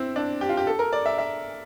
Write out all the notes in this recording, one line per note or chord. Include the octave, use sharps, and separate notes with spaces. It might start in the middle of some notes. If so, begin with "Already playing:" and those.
Already playing: C4 E4
D4
G4
F4
G4
A4
A#4
D5
E5
E5